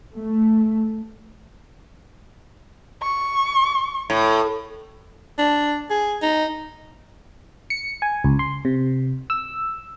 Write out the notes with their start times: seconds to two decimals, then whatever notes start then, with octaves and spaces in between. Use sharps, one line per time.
0.16 A3
3.02 C#6
4.10 A2
5.39 D4
5.90 G#4
6.22 D#4
7.70 C#7
8.02 G#5
8.24 C#2
8.39 C6
8.65 C3
9.30 E6